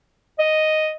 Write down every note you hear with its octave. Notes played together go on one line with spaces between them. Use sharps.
D#5